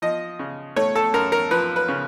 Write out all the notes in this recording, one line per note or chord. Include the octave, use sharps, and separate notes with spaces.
F3 D#5
C#3
A3 C#5
A4
F#2 A#4
A#4
F3 B4
B4
C#3